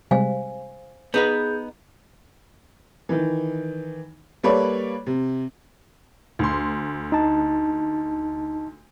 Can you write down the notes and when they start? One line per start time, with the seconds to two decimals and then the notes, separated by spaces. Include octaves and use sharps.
0.11 C3 G3 G#3 C5 F5 G#5
1.14 B3 D#4 G#4 B4 G6
3.09 D#3 E3
4.43 G3 A#3 A4 B4 C#5 D5
5.07 C3
6.39 D2 C6
7.12 D#4 A5